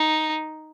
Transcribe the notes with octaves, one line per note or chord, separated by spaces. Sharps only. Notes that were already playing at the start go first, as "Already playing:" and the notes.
Already playing: D#4